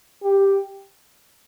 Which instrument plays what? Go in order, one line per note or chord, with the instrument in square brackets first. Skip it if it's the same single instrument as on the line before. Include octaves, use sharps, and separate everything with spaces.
[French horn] G4